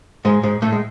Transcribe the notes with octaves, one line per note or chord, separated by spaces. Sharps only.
G#2 G#3
G#2 G#3
A2 A3
G#3